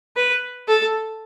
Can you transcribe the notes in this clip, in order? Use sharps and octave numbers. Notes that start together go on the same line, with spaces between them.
B4
A4